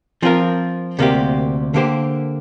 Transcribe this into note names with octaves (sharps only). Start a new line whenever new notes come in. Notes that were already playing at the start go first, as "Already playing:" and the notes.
F3 C4 F4 A#4
D2 C3 A#3 G4
D3 A#3 G4 C5